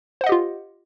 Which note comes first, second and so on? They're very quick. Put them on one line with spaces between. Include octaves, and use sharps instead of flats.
C5 F#5 D#5 G4 F4